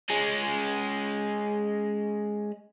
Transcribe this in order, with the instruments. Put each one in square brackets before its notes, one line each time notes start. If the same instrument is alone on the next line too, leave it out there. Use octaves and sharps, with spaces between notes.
[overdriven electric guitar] G#3 C#4